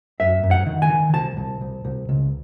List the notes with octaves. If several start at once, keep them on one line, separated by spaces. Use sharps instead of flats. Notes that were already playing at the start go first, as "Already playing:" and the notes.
F#2 E5
F#2
F#5
D#3
G#5
D#3
C2 A5
C2
C2
C2
C#2